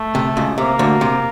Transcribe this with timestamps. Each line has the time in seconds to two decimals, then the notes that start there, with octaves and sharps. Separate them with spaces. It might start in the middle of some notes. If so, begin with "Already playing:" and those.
Already playing: A3
0.15 C3
0.37 C#2 C#3
0.58 C3 A#3
0.79 D2 D3
1.01 C3